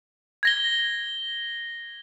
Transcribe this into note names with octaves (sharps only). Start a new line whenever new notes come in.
G#6 A#6 G7